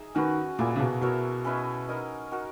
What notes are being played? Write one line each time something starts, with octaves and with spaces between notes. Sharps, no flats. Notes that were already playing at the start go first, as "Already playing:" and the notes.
Already playing: D#4 G#4 E5
D#3 C#4 F#4 B4
A#2 A#3 E4 G#4
C#3
B2
B2 E4 A#4 C#5 E5
C#4 E4 B4 D#5
D#4 A#4 D#5
D#4 F#4 A#4